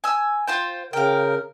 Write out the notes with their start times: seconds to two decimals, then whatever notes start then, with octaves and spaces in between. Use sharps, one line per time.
0.04 G#5 E6
0.47 F4 C5 G5
0.93 C#3 A#4 F5 G5